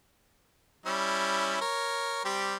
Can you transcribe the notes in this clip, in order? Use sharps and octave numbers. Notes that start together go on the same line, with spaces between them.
G3 C#4 E4
A#4 C#5
G3 C4 G4